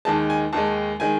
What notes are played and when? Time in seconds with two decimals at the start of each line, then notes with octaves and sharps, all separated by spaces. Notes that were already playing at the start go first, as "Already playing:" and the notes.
0.05 D#2 D#3 G#3 A5
0.30 G#5
0.53 D#2 D#3 G#3 A5
1.00 D#3 G#3 G#5